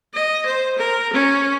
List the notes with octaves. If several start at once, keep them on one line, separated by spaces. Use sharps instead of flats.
D#5
C5
A#4
C#4